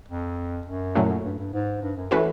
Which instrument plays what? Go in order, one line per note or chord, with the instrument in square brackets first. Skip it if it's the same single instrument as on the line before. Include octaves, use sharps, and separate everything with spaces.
[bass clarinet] F2
F#2
[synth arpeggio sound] A#2 F#3 A3 C#4 E4
[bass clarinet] G2
G2
G#2
G2
F#2
[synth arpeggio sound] E3 A3 C#4 F#4 B4